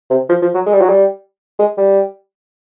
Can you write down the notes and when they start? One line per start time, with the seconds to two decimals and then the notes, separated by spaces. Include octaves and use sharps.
0.10 C3
0.29 F3
0.42 F3
0.54 F#3
0.66 G#3
0.73 G3
0.81 F#3
0.89 G3
1.59 G#3
1.78 G3